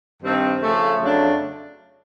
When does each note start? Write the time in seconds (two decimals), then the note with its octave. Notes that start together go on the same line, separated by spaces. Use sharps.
0.23 G2 D#3 G3 C4
0.62 C#3 F3 A3
1.01 F2 C#3 F#3 A3 D4